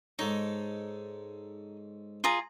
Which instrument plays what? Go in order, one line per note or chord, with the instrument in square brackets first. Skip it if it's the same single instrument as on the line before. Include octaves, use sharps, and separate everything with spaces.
[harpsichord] G#2 A4 C#5 [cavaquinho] D#4
[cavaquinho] F4 G#4 A#5